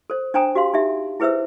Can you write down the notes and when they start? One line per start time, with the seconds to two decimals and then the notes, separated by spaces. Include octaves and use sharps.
0.10 A4 C5
0.34 D4 C5 G5 G#5 A#5 D#6
0.55 F#4 G4 F5 C6
0.74 D#4 G4 E5
1.20 E4 G#4 B4 C5 E5 E6